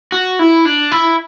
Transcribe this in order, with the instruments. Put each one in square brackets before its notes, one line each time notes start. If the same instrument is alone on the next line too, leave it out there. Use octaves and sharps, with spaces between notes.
[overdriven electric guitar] F#4
E4
D4
E4